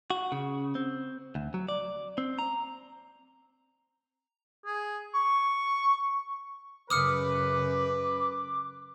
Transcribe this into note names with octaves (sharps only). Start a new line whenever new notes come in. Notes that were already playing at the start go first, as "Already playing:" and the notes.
F#4
C#3
C4
D2
F#3
D5
C4
A#5
G#4
C#6
F#2 C#3 B4 D6 D#6 F6 C#7